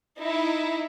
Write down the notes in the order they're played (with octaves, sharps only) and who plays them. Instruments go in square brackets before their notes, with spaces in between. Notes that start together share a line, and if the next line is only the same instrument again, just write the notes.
[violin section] D#4 E4